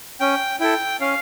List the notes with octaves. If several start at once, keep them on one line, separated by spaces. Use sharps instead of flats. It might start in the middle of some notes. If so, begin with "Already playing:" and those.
C#4 G5
E4 A4 G5
C#4 F5